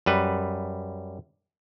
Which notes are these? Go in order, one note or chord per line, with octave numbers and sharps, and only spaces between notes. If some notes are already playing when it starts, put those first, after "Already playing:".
F#2 G3 B4